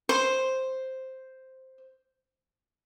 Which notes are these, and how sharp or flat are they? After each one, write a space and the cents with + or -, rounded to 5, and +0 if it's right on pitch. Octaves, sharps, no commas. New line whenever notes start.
C5 +0 C6 +0